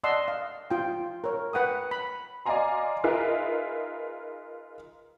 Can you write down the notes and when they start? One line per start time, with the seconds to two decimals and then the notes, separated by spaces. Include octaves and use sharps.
0.04 D5 D#5 F#5 A5 C6 E6
0.28 F5
0.70 F4 G5
1.24 A#4 C#5
1.53 B4 F#5 G5 D#6
1.91 B5
2.46 D5 D#5 F5 G#5 A#5 C6
3.04 D#4 F4 G#4 A#4 B4 E5